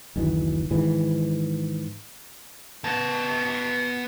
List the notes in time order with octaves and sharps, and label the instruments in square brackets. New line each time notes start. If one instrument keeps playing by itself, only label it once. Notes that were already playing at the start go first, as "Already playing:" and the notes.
[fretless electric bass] F#1 D2 D#3 E3
G#2 D#3 E3
[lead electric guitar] B3 A5